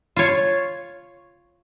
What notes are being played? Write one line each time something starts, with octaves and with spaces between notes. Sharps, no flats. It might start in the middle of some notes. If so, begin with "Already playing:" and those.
F4 C#5